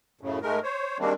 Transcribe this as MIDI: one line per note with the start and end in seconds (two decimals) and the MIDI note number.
0.21 0.39 42
0.21 0.39 45
0.21 0.39 49
0.42 0.60 44
0.42 0.60 56
0.42 0.60 57
0.42 0.60 70
0.63 0.98 72
0.63 0.98 73
0.99 1.13 51
0.99 1.13 55
0.99 1.13 56
0.99 1.13 58
0.99 1.13 60
0.99 1.13 62